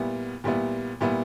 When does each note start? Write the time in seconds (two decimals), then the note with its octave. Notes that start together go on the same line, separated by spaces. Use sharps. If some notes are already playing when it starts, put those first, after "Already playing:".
Already playing: A#2 G3 B3 E4
0.44 A#2 G3 B3 E4
1.01 A#2 G3 B3 E4